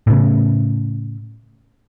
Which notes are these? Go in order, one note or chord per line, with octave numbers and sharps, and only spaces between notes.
A2 C#3